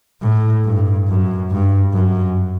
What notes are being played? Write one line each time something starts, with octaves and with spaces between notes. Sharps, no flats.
A2
G2
F#2
G2
F#2